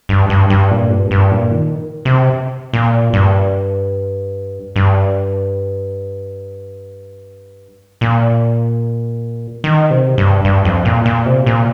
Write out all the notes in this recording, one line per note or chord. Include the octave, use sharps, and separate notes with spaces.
G2
G2
G2
A#2
G2
G2
A#2
D#3
C3
A#2
G2
G2
A#2
D#3
C3
G2
G2
F2
A#2
A#2
C3
A#2